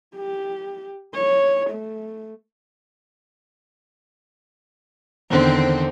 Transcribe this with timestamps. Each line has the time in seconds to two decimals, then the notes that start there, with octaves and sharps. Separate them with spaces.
0.17 G4
1.14 C#5
1.70 A3
5.30 E2 D3 D#3 C4